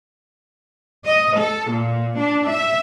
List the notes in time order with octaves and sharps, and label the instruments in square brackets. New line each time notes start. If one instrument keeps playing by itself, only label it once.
[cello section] D#5
A4
A#2
D4
E5